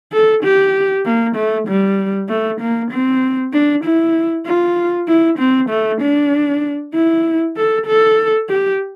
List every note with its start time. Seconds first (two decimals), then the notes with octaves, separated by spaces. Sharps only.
0.12 A4
0.43 G4
1.05 A#3
1.36 A3
1.68 G3
2.29 A3
2.61 A#3
2.91 C4
3.53 D4
3.84 E4
4.46 F4
5.08 E4
5.39 C4
5.70 A3
6.01 D4
6.94 E4
7.57 A4
7.87 A4
8.49 G4